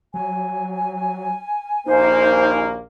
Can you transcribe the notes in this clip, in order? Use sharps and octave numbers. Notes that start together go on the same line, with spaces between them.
F#3 G#5
A#1 D#2 A#3 D#4 C5